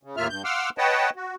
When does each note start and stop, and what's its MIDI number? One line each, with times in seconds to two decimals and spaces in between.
0.03 0.16 49
0.17 0.28 39
0.17 0.28 45
0.17 0.28 58
0.17 0.28 65
0.17 0.28 76
0.17 0.28 89
0.29 0.43 43
0.29 0.43 91
0.45 0.70 77
0.45 0.70 78
0.45 0.70 84
0.45 0.70 86
0.45 0.70 88
0.45 0.70 89
0.78 1.10 71
0.78 1.10 73
0.78 1.10 75
0.78 1.10 78
0.78 1.10 79
0.78 1.10 81
1.16 1.35 66